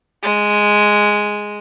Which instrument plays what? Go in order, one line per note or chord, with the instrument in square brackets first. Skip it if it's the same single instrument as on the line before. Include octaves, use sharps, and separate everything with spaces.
[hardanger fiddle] G#3